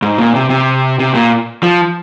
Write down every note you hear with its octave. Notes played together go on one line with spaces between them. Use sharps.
G#2
A#2
C3
C3
C3
A#2
F3